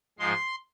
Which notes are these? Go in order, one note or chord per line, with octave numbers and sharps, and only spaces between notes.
G#2 F3 G#3 C6